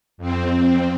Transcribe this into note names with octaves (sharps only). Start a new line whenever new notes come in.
F2 C4